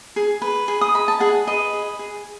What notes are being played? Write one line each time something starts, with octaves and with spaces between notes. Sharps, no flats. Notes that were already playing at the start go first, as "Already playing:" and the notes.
G#4
B4
G#4
D#6
D#5 B5
A5
G#4 F#5
B4 D#5
G#4
G#4